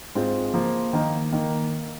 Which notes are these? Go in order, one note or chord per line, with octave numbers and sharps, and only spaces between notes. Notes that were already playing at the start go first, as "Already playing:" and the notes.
G#2 G#3 C4 F4 G#4
F3 A#3 F4
D#3 A#3 D#4
D#3 A#3